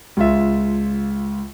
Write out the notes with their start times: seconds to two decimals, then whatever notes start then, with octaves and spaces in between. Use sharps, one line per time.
0.17 C#2 F4 E5